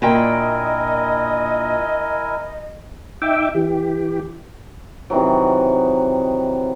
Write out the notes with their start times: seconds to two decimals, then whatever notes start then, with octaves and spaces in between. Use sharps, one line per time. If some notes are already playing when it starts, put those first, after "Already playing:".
0.02 A#2 D3 E4 A#4 D#5 G5 G#5
3.22 D#4 E5 G5 D6
3.55 E3 G4
5.10 C3 D#3 E3 F#3